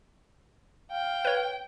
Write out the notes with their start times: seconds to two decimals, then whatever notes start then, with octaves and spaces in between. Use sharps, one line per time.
0.91 F5 G5
1.25 B4 C#5